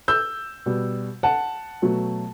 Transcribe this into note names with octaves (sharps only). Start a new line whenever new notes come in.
E6 G6
B2 G3
F#5 A5
B2 F#3 A3